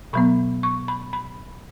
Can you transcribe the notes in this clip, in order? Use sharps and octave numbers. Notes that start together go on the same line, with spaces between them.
B2 F#3 B3 B5
C#6
B5
B5